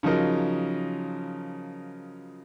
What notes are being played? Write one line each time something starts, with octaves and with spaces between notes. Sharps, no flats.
C#3 F3 F#3 D#4 A#4